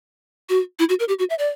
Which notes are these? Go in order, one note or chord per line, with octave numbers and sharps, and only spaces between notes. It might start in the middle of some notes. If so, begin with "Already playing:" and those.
F#4
E4
F#4
A#4
G4
F#4
E5
D5